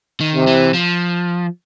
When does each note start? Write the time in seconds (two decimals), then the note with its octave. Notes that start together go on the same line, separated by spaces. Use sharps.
0.21 D#3
0.34 C3
0.47 E3
0.74 F3